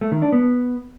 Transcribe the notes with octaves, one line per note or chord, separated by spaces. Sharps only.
A3
D#3
D4
B3